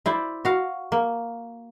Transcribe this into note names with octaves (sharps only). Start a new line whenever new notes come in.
E4 C5 D5
F#4 F5
A#3